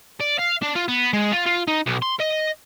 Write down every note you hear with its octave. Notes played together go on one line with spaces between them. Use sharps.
D5
F5
D4
F4
B3
G#3
F4
F4
D#4
B1
C6
D#5